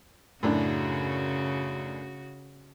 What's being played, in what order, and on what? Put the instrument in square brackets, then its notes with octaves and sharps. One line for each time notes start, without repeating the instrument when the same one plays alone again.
[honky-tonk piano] F#2 A2 D4 [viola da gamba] C#3 F#4